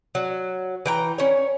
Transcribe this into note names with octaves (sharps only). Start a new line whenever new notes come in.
F#3
E3 G5 A#5
C#4 C#5